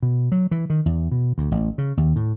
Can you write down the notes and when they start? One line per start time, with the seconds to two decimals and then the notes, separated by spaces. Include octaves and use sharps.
0.03 B2
0.32 F#3
0.51 E3
0.70 D#3
0.86 E2
1.12 B2
1.38 D2
1.51 A1
1.78 C#3
1.97 D#2
2.16 A2